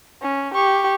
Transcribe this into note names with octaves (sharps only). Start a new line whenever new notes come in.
C#4
G4 C#6